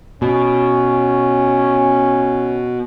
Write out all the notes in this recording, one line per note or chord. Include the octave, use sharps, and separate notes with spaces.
B2 C#4